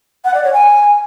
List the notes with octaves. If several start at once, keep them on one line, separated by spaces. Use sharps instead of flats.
F#5
D5
C#5
G#5